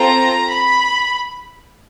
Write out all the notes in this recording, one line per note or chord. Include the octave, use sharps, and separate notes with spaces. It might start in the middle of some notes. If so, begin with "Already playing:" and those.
Already playing: C4 F4 A4 A#5
B5